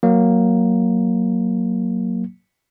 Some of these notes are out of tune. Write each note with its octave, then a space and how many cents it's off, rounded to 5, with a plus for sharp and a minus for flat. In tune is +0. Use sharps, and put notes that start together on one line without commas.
F#3 +0 A#3 +0